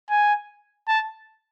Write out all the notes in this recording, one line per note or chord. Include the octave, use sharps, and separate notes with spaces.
G#5
A5